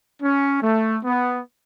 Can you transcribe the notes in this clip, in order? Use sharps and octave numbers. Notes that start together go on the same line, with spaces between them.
C#4
A3
B3